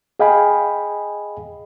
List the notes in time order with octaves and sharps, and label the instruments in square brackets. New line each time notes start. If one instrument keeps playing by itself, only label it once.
[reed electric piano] G#4 D#5 F5 G5 G#5 B5